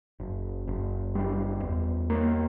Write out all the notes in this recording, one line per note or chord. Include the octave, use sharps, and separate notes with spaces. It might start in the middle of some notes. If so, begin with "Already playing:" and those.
F#1
F#1
G3
E2
A#3